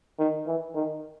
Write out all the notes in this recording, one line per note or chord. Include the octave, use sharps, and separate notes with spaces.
D#3
E3
D#3